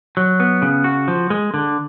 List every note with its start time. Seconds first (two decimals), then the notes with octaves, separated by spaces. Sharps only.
0.17 F#3
0.40 B3
0.62 C#3
0.84 F#4
1.08 F3
1.30 G#3
1.54 D3